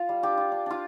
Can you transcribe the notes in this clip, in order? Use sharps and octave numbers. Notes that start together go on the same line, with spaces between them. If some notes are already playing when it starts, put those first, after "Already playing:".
Already playing: F4 F5
G3
D4 G4
F4
D4
D4 F4